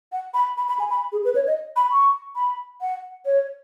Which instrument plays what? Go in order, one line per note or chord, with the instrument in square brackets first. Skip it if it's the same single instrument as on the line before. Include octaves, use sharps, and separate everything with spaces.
[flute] F#5
B5
B5
B5
G#5
B5
G#4
B4
C#5
D#5
B5
C#6
B5
F#5
C#5